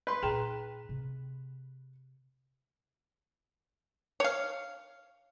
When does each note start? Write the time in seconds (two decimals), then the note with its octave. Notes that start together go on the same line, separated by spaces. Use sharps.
0.07 B4 C6
0.23 A#2 D#4 G#4 G5 A#5
0.89 C3
4.20 C#5 F5